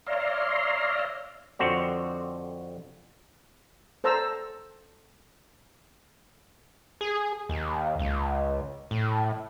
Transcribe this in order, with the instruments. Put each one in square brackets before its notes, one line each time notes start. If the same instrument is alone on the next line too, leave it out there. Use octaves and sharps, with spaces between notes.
[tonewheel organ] C#5 D5 E5 F5 A#5 C6
[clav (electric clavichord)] F2 D3 C4 F#4 C#5
[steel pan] A4 C5 A5 A#5 E6
[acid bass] G#4
D#2
C#2
A2